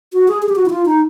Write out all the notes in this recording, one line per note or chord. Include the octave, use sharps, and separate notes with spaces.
F#4
G#4
G#4
G4
F#4
E4
F4
D#4